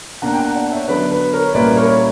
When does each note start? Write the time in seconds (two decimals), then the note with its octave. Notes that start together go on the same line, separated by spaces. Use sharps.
0.22 B2 A#3 D4 F#5 A#5
0.33 G5
0.39 F#5 A#5
0.56 D5 F#5
0.72 C#5 E5
0.88 D3 F#3 B3 B4 D5
1.11 B4
1.33 A#4 C#5
1.54 A#2 G3 A#3 C#4 E4 B4 D5
1.77 A#4 C#5